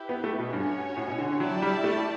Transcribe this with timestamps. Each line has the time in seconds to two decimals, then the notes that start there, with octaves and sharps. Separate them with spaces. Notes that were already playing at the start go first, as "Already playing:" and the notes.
Already playing: E4 G4 B4
0.09 B3
0.24 A3
0.39 B2
0.52 G2 C#4 F#4 C#5
0.97 A2
1.07 B2
1.19 D3
1.30 D3
1.40 F#3 E4 G4 D5 A5
1.62 G3
1.84 A3